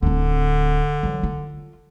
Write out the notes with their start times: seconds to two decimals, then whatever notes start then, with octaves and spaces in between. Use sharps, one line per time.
0.02 D1 D3 C4
1.03 E3 F#3
1.23 F4